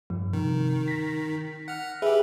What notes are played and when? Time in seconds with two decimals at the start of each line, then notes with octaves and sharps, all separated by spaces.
0.10 G2 F3
0.33 C3 D#3
0.88 A#6 B6
1.68 F#5 F6
2.02 G4 G#4 B4 E5